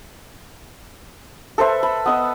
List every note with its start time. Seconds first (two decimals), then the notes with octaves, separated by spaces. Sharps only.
1.58 A4 B4 C5 E5
1.83 B5
2.06 B3 D#5 E6